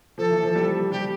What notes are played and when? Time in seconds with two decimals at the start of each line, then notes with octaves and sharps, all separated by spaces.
0.18 F3 A4
0.30 E3
0.43 F3
0.55 G3
0.92 G3 G4